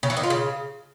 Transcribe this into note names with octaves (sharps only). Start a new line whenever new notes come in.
C#3
E3
D#3
F4
C#3